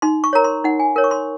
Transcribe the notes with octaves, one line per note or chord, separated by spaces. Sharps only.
D#4 C6
C#6
A#4 C#5 A#5
C6
D#4 F#5
G#5
A#4 C#5
C#6
C6